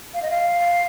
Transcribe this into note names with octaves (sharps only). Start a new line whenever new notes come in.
F5
D#5
F5